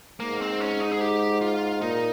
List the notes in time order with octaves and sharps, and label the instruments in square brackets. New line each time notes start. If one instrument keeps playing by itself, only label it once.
[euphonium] G#2 [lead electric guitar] A#3
[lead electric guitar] C4
C#4
D#4
G#4
G4
F4
[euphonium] A#2 [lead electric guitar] D#4